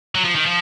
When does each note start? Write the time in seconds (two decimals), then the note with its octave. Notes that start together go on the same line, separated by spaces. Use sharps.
0.15 F#3
0.24 F3
0.35 D#3
0.46 F3